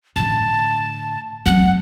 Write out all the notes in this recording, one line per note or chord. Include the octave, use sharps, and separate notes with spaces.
A2 D3 A5
F#3 C4 F#5